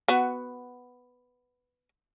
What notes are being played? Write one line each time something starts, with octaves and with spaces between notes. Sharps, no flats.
B3 F#4